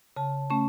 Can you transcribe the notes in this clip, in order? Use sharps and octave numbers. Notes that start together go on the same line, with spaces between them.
C#3 A5
A3 C#4 A5